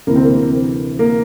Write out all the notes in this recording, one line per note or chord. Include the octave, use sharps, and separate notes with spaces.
D2 C3 E3 A#3
C4
A#3
A#3